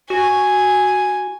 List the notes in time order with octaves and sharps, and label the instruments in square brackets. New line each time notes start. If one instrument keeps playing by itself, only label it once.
[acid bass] F#4 [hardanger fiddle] G#5